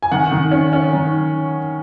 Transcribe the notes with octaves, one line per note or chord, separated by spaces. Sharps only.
G#5
D#3 F#5
D#3
C#4
C#4
D#3